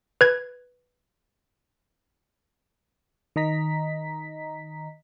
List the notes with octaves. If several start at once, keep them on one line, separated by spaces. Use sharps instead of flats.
B4 G#6
D#3 D#5 A#5 B6